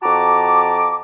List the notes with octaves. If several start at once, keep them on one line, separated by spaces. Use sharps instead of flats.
F2 F#4 A5 A#5 D6